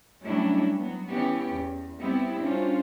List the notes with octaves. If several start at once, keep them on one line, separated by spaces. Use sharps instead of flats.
F#3 G3 A3 C#4 D4 E4
F#3 B3
E3 B3 C#4 G4
E2
G3 B3 C4 E4 G4
G3 C#4 D4 F4 C5